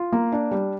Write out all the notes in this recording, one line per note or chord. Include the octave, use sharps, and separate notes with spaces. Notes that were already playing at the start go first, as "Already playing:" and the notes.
Already playing: F4
A#3
D4
G3